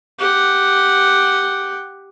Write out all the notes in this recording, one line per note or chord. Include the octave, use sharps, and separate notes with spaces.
G4 F#5